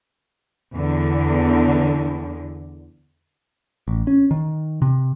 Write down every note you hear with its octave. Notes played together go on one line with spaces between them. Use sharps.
E2 D3
A1
C#4
D#3
C3